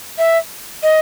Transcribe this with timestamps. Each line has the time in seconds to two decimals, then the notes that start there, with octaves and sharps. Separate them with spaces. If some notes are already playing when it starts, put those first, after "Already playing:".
0.18 E5
0.83 D#5